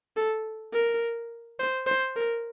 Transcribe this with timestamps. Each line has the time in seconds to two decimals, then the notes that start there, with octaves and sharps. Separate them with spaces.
0.17 A4
0.73 A#4
1.60 C5
1.87 C5
2.16 A#4